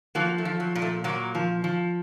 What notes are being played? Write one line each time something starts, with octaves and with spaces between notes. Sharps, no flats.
F3 F#3 A#3
A3
F3
F#3
A#2
A3
A#2 F#3 A#3
F3
F3